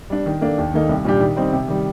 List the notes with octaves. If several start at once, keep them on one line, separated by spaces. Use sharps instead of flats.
G3 D4
D#3
A#3 D4 A4
D#2
D#3 A#3 D#4 A4
C2
A#2 G3 D4 G4
D#3
G3 C4 D#4
C3
D#3 G3